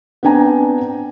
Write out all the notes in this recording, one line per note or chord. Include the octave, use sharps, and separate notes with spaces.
B3 C4 D4 G5 G#5 A#5